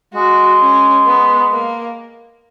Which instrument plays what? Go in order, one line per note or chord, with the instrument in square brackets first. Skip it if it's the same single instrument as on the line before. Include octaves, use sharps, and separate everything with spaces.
[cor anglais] G#3 [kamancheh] F#4
[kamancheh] C#4
B3
A#3